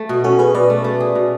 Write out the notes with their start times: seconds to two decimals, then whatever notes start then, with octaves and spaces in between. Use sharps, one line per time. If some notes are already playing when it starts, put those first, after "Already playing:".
Already playing: A3
0.09 B2
0.24 C#4 F#4 A4
0.39 C#4 G#4 B4
0.54 B2 B4 D5
0.70 A3
0.84 A3
1.00 G#4
1.15 B2